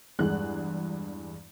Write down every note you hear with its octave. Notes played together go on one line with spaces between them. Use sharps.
E2 G2 G#3 F#6